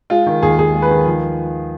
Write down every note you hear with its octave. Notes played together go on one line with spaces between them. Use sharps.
G#3 F4
D#3
D#2 G#4
D#2 G#4
G#3
B4
D#3
F3